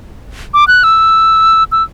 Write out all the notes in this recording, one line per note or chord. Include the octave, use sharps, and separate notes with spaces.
D6
F#6
E6
E6